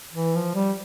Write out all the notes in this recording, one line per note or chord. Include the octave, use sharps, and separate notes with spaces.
E3
F3
G3